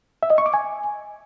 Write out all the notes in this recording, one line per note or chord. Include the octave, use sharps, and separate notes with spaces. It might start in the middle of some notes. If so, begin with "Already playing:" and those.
E5
D#5
C#6
D6
G#5